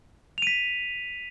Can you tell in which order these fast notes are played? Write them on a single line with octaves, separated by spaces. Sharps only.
F7 D#7 B6